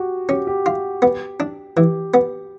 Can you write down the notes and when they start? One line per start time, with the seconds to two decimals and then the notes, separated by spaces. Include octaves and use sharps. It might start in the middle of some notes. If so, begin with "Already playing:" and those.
Already playing: F#4 G4
0.29 C#4 G4
0.47 G4
0.66 F4
1.02 B3
1.40 D4
1.76 E3 G4
2.14 B3